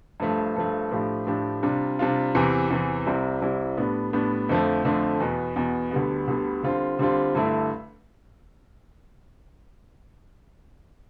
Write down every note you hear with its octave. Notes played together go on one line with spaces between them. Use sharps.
G2 F3 A3
G2 F3 A3
A2 F3 A3 D4 G4
A2 F3 A3 D4 G4
C3 G3 D4 F4
C3 G3 D4 F4
E2 C3 E3
E2 C3 E3
C2 C3 G3 C4 E4
C2 C3 G3 C4 E4
A2 G3 B3 D4
A2 G3 B3 D4
F2 D3 F3 A3
F2 D3 F3 A3
E2 B2 B3
E2 B2 B3
D2 D3 G3 B3
D2 D3 G3 B3
D3 G3 C4 F4
D3 G3 C4 F4
G2 D3 A3 E4